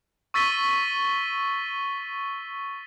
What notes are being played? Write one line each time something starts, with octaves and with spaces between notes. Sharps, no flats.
C#6 E6 A6 B6 D#7 G7